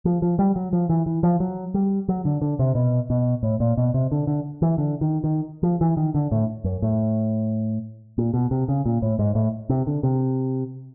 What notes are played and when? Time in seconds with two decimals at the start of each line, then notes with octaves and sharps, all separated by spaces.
0.05 F3
0.22 F3
0.39 G3
0.56 F#3
0.73 F3
0.89 E3
1.06 E3
1.23 F3
1.40 F#3
1.74 G3
2.09 F#3
2.25 D3
2.42 D3
2.59 C3
2.75 B2
3.10 B2
3.43 A2
3.60 A#2
3.77 B2
3.94 C3
4.12 D3
4.27 D3
4.62 E3
4.78 D3
5.01 D#3
5.24 D#3
5.63 F3
5.81 E3
5.97 D#3
6.15 D3
6.32 A2
6.64 F#2
6.82 A2
8.18 A#2
8.34 B2
8.51 C3
8.68 C#3
8.86 A#2
9.02 A2
9.19 G#2
9.35 A2
9.69 C3
9.87 D3
10.03 C3